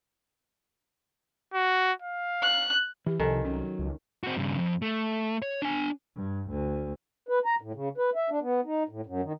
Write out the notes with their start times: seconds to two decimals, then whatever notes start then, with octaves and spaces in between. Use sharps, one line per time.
1.54 F#4
2.02 F5
2.43 F#6
3.06 E3 G4
3.20 C2 C3 D#3 F3 A4 G#5 A5
3.45 F#3 C#4
3.79 C#2
4.24 C4 F#4
4.37 G2 C#3
4.57 F2
4.82 A3
5.42 C#5
5.62 D4 G#5
6.15 G2
6.49 D2
7.29 B4
7.45 A#5
7.61 A2
7.75 C#3
7.98 B4
8.15 E5
8.30 D4
8.42 B3
8.65 D#4
8.89 A2
9.06 F#2
9.23 D#3